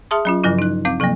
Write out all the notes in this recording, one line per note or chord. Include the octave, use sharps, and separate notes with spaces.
G#4 E5 A5 C6 D#6
F#3 C#4 F4
G2 C#3 F3 F#3 E4
D#4 F#6
C4 F5 D6 G6
C3 F3 F#3 A#3